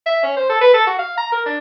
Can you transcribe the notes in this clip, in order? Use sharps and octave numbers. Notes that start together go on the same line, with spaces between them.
E5
C#4
C5
A4
B4
A4
F#4
F5
A#5
A#4
D4